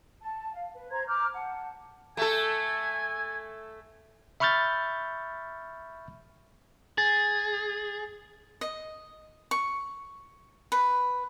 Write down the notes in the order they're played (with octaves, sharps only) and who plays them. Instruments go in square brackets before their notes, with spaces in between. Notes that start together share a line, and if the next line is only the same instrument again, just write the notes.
[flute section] A5
F5
B4
C5 A#5 C6 G#6
A#5 D6 F6 G6
F#5 A5
[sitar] A3 A4 [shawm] G#5
[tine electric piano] E5 B5 C#6 F6 G6 A6
[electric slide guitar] G#4 [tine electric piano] A6
[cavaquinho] D#5
C#6
B4